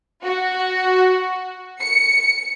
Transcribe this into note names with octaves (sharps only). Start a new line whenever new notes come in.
F#4
C#7